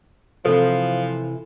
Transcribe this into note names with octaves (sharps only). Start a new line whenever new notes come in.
C3 E3 F3 A4